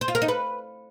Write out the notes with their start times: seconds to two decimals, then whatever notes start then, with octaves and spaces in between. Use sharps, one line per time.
0.01 C5
0.08 F4
0.15 A#4
0.22 D#4
0.28 B4